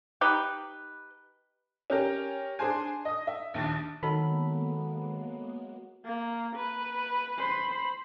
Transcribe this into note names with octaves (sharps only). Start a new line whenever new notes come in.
D#4 G4 B4
C#4 G4 A#4
D4 G#4 C5 G#5
D#5 D#6
E5
A#1 D#2 D4 A6
D#3 F#3 G#3 A#3 B3 A4 B5
A#3
B4
C5 B5